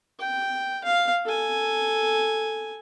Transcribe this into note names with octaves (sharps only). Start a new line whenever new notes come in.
G5
F5
A4 G#5